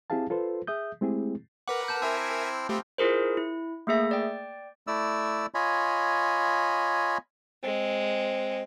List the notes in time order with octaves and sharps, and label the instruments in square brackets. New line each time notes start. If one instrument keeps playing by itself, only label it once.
[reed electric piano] C4 E4 G4 G#4 F5 A5
F4 A4 B4 C5
G#4 E5 D#6 G6
G#3 A3 C4 E4 G4 G#4
[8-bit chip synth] A#4 B4 F#5 [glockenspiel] D6
[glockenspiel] A5 F6 G6
[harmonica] C4 E4 [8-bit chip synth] A#4 E5 G#5 [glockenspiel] E6
[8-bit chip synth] A3 G4 [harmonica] B3 C4 F4
[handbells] E4 F4 G#4 A#4 C5
E4
A3 A#3 G#4 E5
D5 G5
[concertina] A3 E4 D5 E6
F4 C#5 D#5 G#5 B5
[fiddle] G#3 [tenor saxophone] C4